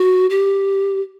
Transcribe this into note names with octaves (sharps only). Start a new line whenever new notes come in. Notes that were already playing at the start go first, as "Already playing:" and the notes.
Already playing: F#4
G4